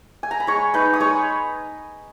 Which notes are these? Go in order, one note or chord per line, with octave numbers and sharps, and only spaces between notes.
G#5
A#5
B5
G#3 C#5 C#6
D#4 B4 B5
D#6
G#3 C#5 C#6